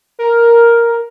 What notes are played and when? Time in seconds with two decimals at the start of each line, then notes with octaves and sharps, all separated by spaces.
0.19 A#4